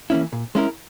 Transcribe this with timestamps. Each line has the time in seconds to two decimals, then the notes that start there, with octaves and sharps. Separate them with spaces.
0.10 E3 A#3 C#4 E4
0.32 A#2
0.55 G#3 C#4 E4 A#4